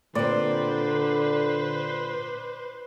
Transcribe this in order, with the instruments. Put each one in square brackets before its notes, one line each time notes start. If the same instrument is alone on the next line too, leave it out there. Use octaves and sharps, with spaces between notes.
[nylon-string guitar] A#2 C4 [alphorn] D3 [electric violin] B4 C5 [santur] D5